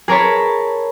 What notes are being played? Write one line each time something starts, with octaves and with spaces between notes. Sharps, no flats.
G#4 A#4 C#5 A5 B5